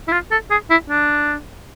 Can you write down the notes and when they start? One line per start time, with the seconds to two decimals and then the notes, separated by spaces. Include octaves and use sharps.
0.08 E4
0.12 F4
0.31 A4
0.51 G#4
0.70 E4
0.90 D4